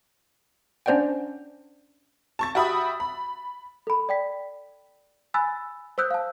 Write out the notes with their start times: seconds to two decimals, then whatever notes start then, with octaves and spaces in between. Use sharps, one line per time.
0.86 C#4 D4 C5 D5 F#5 G5
2.39 A5 C#6 A6
2.55 F#4 G4 E5 B5 D#6
3.00 B5
3.87 A4 B5
4.09 D5 G5 B6
5.34 G#5 B5 E6 F#6 A6
5.98 C5 D#6 E6 F#6 G6
6.11 F5 A5